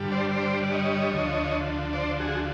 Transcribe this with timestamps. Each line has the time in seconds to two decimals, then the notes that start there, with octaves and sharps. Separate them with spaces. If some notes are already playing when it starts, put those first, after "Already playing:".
Already playing: G2 D3 G3
0.12 C5 D5
0.31 C5 D5
0.63 D5
0.72 C#5 D#5
1.12 D2 D3 F3
1.93 C5 D5
2.20 F#4 G#4